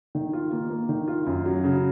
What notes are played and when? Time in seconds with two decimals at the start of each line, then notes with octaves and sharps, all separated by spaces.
0.15 D#3
0.33 F4
0.52 A#3
0.70 A#3
0.89 D#3
1.08 F4
1.27 F#2
1.45 F#3
1.64 C#3